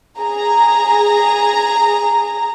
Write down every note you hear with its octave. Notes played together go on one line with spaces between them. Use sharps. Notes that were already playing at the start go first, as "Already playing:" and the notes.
G#4 A#5